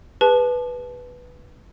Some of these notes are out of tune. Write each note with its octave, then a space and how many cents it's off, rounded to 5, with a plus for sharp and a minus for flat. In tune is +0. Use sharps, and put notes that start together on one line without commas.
G#4 -45 B4 +0 A5 -25